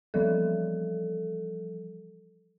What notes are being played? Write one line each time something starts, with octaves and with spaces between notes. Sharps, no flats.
E3 F3 G3 A4